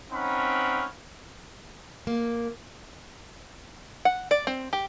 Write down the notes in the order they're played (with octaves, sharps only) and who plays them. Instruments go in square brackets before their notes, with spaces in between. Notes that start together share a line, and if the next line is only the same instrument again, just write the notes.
[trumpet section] C4 C#4 D#4 F5 F#5 B5
[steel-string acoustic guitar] A#3
[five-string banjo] F#5
D5
C4
G4